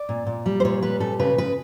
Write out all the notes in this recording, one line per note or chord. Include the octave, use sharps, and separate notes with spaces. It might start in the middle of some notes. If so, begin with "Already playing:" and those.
Already playing: D5
A#2
A#2
G3
C5
A#2 C#5
G3 B4
A#2 A4
C#3 B4
C#3 B4